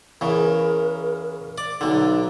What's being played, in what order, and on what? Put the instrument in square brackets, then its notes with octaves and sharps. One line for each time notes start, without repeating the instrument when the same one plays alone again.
[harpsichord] E2 C#3 [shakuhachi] A#4
[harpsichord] D5
[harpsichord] B1 D3 [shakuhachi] D#4